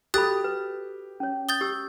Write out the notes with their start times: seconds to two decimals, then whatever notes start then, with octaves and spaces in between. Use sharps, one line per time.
0.14 F#4 G4 A4 B5 D#6 F#6 A6
0.44 B4
1.20 C#4 C#5
1.49 D#6 G6 A6 G7
1.61 G4 E6